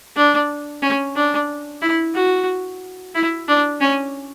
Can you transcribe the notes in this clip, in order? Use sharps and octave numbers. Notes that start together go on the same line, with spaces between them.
D4
C#4
D4
E4
F#4
E4
D4
C#4